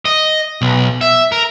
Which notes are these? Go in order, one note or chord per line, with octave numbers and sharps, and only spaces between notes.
D#5
B1
E5
A#4